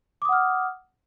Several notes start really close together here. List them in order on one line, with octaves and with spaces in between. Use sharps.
D6 D#6 F#5 F6